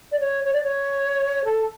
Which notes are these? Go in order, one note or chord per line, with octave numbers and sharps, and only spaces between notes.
D5
C#5
C#5
D5
C#5
A4